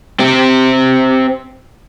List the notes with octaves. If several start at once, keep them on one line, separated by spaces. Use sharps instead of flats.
C4 G4